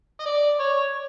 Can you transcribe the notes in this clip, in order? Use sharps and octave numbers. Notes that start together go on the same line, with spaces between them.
D#5
D5
C#5